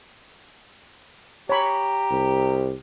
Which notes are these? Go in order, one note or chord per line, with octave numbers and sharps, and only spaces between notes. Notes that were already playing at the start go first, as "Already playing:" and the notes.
G4 C#5 A#5 B5
C2